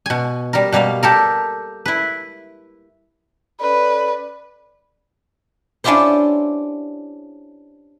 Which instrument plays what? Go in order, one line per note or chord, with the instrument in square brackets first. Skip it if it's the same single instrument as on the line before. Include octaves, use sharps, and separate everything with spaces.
[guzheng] B2 G#5
G3 A#4
B2 G3 A#3 F5
G4 A4 A#4
E4 B4
[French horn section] C#4 A4 D5 [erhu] B4
[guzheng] C#4 D4 E4 F4 G4 C5